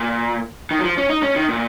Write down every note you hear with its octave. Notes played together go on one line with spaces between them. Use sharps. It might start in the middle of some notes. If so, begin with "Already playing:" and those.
Already playing: A#2
D#3
F#3
F3
C#4
D#4
C#4
D#3
A#2